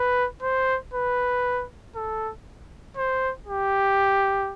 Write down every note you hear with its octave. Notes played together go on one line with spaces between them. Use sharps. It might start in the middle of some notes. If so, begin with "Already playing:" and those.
Already playing: B4
C5
B4
A4
C5
G4